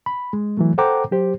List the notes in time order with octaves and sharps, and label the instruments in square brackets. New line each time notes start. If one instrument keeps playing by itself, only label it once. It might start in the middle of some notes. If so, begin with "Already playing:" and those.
[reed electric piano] B5
G#3
E3 F#3 A3
A4 C5 F#5 G5 A#5 D6
F#3 G4 C5